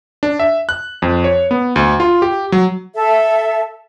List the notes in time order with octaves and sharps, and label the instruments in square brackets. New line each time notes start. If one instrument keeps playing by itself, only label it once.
[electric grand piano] D4
E5
F#6
F2
C#5
B3
D2
F4
G4
F#3
[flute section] A4 E5